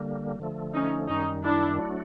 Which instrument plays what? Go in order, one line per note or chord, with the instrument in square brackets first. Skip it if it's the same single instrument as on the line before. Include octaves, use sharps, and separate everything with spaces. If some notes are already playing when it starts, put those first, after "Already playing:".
Already playing: [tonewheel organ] D3 G3 A#3
D3 F3 A3
[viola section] C#4 D#4
[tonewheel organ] F#2 D#3 G3 [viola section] C#4 D#4
[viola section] D4 E4
[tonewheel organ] F#3 A3 D4 F#4